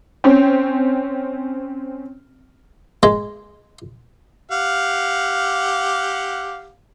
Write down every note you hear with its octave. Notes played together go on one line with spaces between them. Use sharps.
C4 C#4
G#3
G4 F5 F#5